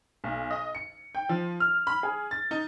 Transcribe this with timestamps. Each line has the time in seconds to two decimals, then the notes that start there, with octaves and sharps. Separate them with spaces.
0.24 B1
0.51 D#5
0.75 C#7
1.15 G5
1.29 F3
1.60 F6
1.87 B5
2.03 G#4
2.31 A6
2.51 D#4